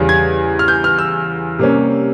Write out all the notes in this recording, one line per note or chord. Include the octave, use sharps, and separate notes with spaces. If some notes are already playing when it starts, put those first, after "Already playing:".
Already playing: E2 C#3 G3
G#6
F6
G6
F6
E6
C3 G3 A#3 C#4